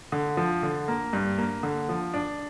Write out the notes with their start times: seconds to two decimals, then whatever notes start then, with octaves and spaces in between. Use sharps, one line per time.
0.12 D3
0.37 F3
0.63 D3
0.88 A#3
1.13 G2
1.38 A#3
1.63 D3
1.89 F3
2.14 D4